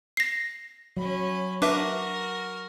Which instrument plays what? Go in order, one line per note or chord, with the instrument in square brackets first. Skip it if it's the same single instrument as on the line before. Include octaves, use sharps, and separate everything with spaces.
[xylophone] A#6 C7
[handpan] F#3 [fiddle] C#4 B5
[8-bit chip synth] D4 B4 E5 [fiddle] F#4 A#4 [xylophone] D6